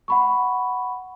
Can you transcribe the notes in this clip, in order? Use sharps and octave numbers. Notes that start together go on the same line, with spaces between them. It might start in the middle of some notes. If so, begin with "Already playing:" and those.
F#5 B5 C#6